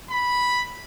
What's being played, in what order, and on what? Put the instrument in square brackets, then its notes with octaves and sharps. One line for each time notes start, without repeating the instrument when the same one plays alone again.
[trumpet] B5